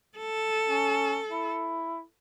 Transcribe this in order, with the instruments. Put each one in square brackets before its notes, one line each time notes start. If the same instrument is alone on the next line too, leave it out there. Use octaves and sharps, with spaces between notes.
[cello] A4
[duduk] C#4
E4